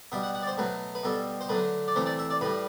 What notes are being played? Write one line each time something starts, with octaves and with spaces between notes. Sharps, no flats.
B2 G3 E5
F#5
F#5
D5
C5
B2 F#3 A3 B4
B4
B2 G3 A4
C5
D3 F#3 A3 B4
D5
C3 E3 A3 C5
D5
E5
D5
A2 G3 B4